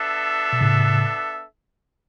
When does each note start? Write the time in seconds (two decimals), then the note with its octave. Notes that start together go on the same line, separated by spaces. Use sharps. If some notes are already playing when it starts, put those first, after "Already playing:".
Already playing: B3 D4 A4 E5
0.53 B2
0.61 A2 C#3